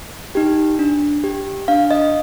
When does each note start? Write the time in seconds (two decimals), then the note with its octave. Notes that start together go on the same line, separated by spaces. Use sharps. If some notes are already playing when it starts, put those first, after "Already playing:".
0.35 D#4 G4
0.79 D4
1.24 G4
1.68 D4 F5
1.91 D#5